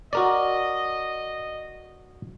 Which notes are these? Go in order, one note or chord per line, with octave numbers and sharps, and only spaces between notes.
F#4 A#4 D5 D#5